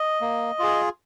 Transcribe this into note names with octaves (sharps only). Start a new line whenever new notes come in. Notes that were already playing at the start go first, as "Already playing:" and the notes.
Already playing: D#5
A#3
F4 G#4